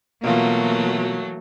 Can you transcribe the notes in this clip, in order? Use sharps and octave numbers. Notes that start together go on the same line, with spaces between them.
B2 E3 F#3 A3 A#3 F4